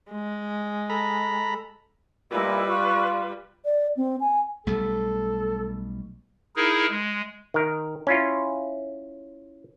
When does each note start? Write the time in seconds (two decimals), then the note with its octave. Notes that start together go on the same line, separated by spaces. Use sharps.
0.11 G#3
0.90 A4 A#5 B5
2.31 A#2 G3 E4 B4 D#5
2.68 F4 C#6 F#6
3.65 D5
3.97 C4
4.20 G#5
4.67 B1 G3 A3 A4
6.56 D#4 E4 G#4 A#4
6.90 G#3
7.54 D#3 A#4
8.07 C#4 E4 F4